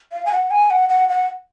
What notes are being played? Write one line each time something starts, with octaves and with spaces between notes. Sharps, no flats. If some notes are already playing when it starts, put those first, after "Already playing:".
F5
G#5
F#5
G#5
F#5
F#5
F#5